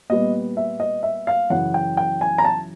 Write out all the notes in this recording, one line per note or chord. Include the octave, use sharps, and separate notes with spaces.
A#2 G3 B3 D#5
E5
D#5
E5
F5
F#2 C#3 E3 F#5
G5
G5
G#5
A#5
A5